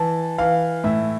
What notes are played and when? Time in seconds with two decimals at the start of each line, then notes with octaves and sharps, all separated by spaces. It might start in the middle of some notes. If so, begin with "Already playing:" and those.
Already playing: E3 A5
0.38 E3 F5
0.84 A2 E5